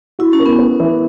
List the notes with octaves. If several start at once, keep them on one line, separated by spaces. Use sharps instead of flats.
E4 F#4
C#4
A#4
B3
B3
E3